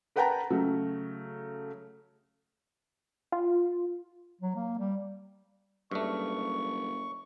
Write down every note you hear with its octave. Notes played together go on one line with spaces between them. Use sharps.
A#4 B4 F#5 G5 A5 A#5
C#3 F#3 A3
F4
F#3
A#3
G3
F#1 G2 A3 C#6